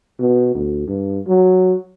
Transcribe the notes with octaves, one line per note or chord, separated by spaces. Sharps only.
B2
D2
G2
F#3